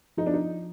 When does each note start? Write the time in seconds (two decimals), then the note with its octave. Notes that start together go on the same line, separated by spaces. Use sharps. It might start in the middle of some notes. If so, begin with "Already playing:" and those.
0.17 F3 D#4
0.26 D4
0.34 D#4